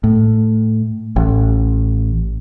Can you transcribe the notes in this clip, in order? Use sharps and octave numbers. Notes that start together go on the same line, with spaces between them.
A2
A1